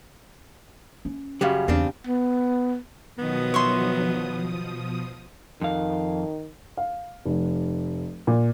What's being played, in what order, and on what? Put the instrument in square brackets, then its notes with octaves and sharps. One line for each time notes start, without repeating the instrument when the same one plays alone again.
[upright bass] C#4
[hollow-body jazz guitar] F#2 C#3 G3 [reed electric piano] G4 F5
[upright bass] E2 [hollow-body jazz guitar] C#3 C4 D4
[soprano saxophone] B3
[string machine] B2 F3 D#6 [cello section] D#3 F#3 [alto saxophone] B3
[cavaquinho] C#5 E5 C6
[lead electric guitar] F2 F5 [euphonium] D#3
[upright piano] F5
F1
A#2